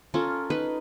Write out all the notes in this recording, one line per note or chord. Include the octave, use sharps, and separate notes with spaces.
C#4 F4 A4 A#4
D#4 B4 B5